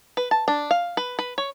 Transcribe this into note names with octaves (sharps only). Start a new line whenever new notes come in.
B4
A5
D4
F5
B4
B4
C#5